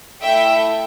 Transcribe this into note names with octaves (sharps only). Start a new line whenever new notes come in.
A3 E4 A4 E5 G5